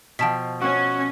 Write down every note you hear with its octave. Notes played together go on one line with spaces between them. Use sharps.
B2 F3 G5 A5 B6
C#4 F#4